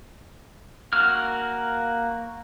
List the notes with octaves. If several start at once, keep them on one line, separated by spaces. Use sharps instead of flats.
A#3 F#4 F6